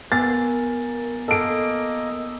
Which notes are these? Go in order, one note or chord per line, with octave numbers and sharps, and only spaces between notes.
B3 A#4 B4 G#5 A6
A#3 A4 D#5 D7